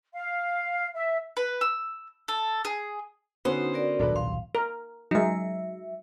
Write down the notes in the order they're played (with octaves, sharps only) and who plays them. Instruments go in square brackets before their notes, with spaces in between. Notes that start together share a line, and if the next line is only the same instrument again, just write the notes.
[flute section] F5
E5
[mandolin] B4
E6
A4
G#4
[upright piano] D3 B3 C#4 [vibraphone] D#4 F#4 [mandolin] C5
[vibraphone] F#4 A#4 D5
[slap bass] D#1 B1 G#2 [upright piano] D4 A4 B4
[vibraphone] F5 [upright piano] C6
[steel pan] A#4
[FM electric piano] F#3 E5 [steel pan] G#3 D#4